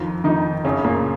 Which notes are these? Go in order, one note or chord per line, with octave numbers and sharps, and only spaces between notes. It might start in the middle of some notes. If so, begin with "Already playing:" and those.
Already playing: F2 D#3 F3 F4
F2 D#3 D#4
F#2 C#3 C#4
A#2 A#3